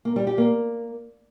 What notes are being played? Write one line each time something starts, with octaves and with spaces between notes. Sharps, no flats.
A#3
G3
G4
A#3